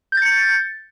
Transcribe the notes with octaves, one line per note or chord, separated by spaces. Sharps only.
G6 A6 C#7